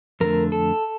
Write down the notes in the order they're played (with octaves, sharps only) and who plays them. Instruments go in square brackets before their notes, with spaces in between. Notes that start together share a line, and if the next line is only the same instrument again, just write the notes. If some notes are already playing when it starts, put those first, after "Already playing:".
[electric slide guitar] F2 D3 A3 A#4
A4